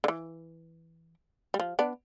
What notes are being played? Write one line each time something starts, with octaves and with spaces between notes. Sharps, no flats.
D3
E3
G3
F3
B3 D4